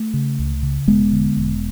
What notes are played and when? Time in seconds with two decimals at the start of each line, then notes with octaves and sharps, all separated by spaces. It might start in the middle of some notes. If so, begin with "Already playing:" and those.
Already playing: A3
0.14 C#3
0.39 C#2
0.63 C#3
0.87 E1 G#3 B3
1.12 D3
1.37 E1